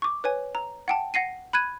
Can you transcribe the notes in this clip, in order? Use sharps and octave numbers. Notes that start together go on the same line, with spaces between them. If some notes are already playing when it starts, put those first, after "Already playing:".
C#6 D6
B4 C#5 G#5
A#5
F#5 G5 A5
F#5 A#6 C7 D#7
B5 F#6 G#6 D#7